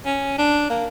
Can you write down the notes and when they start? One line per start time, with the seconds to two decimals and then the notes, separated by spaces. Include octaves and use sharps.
0.06 C#4
0.38 D4
0.70 A#3